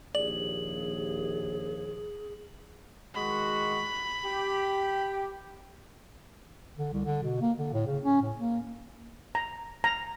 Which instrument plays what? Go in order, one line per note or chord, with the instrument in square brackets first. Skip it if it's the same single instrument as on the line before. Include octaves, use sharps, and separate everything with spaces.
[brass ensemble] A#1 D#2 [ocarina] G#4 [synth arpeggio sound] D5 [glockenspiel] F#7
[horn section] D#3 G#3 F#4 [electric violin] B5
[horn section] G4
[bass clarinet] D3
C2
D3
B2
A#3
D3
A2
C#3
C#4
A2
A#3
[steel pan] A#5
A#5